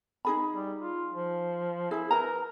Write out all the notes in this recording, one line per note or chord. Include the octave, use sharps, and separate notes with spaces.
D#4 G#4 B5
G3
F4
F3
E4 G#4
A#4 B4 A#5